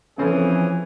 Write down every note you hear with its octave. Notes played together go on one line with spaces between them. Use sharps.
C#3 E3 F3 C4 C#4 G#4 A4